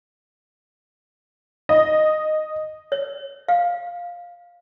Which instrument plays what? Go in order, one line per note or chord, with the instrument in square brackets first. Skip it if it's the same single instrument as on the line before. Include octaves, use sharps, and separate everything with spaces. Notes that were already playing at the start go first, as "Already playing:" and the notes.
[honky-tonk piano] D#5
[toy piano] C#5
F5